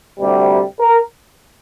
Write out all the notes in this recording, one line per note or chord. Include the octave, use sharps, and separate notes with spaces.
D2 C3 G3
A#4